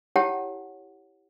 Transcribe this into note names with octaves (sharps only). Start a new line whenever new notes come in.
E4 G4 C#5 F#5 G5 A5